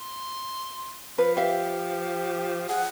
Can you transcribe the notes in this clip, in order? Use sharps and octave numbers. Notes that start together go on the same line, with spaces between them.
C6
F3 B4
G4 E5 F5
G#4 F#5